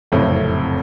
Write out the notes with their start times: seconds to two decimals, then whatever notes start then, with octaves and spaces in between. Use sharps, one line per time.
0.12 F#1 F2 A2 C3